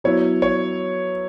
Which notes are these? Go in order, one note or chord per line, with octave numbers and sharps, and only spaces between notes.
F#3 B3 E4 C#5
C#5